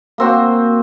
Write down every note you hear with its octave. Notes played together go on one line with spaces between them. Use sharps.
A#3 C4 F#4